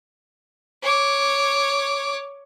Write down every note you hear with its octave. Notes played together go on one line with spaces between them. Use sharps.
C#5 D6